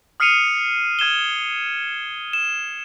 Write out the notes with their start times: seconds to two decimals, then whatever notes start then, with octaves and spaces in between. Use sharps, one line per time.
0.20 D#6 F6 C7 C#7 D#7 F7
0.99 F6 G#6 E7 G7
2.33 E7